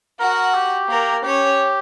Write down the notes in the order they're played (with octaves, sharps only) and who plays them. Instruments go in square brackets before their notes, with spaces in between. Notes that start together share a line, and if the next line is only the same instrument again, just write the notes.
[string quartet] F#4 F#5 [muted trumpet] A#4
[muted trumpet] G4
[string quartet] A#3 A#4
[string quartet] C#4 C#5 [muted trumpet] G4